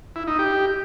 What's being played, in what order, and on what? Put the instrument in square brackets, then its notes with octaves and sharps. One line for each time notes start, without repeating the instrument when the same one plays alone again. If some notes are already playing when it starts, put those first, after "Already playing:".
[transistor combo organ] E4
D#4
G4